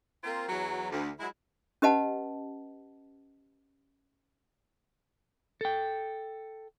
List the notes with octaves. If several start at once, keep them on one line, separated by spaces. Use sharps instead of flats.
A#3 C4 F4 A#4 C5
E2 F#3
D2
F#3 G#3 E4
C#4 G4 B4 D#5 F#5 A5
A4 G5